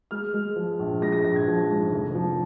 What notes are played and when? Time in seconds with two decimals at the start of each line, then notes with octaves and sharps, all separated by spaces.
0.11 G#3 F6
0.34 G#3
0.56 F3
0.79 A#1
1.01 G#3 A#6
1.12 A#6
1.24 A#1 A#6
1.36 G#6
1.47 F3
1.70 G#2
1.92 F1
2.15 F3